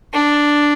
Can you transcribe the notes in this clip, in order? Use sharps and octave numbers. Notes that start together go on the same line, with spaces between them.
D4